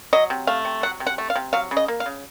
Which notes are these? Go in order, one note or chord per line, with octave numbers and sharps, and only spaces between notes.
F#3 D#5
C3
A3 F5
C3
F#3 F#5
C3
F#5
A3
F5
C3
F#3 F5
C#3
D#5
A#3
F5
C#3